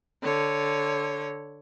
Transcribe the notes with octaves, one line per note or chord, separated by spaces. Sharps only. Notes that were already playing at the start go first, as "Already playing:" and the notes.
D3 C#5